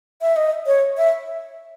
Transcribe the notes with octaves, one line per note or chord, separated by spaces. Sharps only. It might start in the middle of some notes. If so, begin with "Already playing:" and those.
E5
D#5
C#5
E5